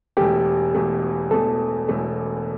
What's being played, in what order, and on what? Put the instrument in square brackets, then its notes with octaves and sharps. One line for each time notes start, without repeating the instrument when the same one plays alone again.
[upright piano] E1 E2 B2 A3 [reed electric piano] G4
[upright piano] E1 E2 B2 A3
[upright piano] E1 E2 B2 A3 [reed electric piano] A4
[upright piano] E1 E2 B2 A3